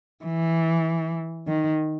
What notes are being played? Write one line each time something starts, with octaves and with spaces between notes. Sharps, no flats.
E3
D#3